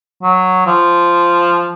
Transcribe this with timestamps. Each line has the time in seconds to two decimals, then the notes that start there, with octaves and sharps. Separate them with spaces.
0.23 F#3
0.67 F3